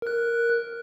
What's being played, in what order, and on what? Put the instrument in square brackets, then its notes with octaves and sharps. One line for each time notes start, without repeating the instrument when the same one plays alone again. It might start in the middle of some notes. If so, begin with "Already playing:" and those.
[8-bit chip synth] A#4 F#6